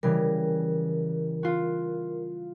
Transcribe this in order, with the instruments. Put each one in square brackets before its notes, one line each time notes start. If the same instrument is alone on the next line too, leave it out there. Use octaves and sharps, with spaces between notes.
[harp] C#3 E3 G3 [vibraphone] A#4
[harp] F4 F#4